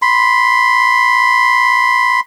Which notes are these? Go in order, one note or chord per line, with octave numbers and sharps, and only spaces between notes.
B5 C6